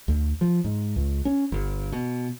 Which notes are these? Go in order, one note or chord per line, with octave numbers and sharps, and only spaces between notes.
D2
F3
G#2
C#2
C#4
G1
B2